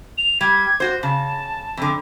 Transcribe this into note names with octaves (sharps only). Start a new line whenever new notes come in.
F7
G3 G#6
F#4 C5
C#3 A5
F2 D3